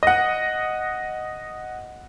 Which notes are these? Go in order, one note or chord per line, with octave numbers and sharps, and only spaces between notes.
D#5 F#5